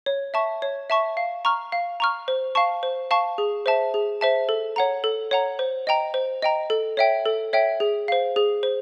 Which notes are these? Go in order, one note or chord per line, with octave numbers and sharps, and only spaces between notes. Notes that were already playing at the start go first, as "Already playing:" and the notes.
C#5
E5 A5 C#6
C#5
E5 A5 C#6
F5
A#5 C#6 F6
F5
A#5 C#6 F6
C5
F5 A5 C#6
C5
F5 A5 C#6
G#4
C5 E5 A5
G#4
C5 E5 A5
A4
C#5 F#5 A#5
A4
C#5 F#5 A#5
C5
D#5 G5 A#5
C5
D#5 G5 A#5
A4
C#5 E5 G5
A4
C#5 E5 G5
G#4
C5 F5
G#4
C5